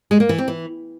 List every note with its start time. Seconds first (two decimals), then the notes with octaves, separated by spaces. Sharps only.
0.11 G#3
0.20 A#3
0.29 E3
0.38 C4
0.48 E3